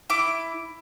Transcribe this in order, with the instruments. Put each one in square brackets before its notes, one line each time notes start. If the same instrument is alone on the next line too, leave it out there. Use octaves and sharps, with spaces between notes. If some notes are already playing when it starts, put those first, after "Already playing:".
[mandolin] E4 D6